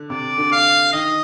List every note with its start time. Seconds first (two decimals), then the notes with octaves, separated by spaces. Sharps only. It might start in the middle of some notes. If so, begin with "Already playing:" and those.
Already playing: D3
0.10 C3 D5
0.38 D3
0.52 F5
0.93 D#3 D#5